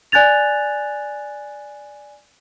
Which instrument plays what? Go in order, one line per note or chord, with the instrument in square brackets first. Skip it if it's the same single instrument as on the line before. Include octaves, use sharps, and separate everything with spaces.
[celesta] D5 G#5 F#6 G#6 A6 F7